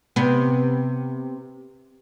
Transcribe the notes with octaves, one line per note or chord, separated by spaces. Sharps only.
C3 B3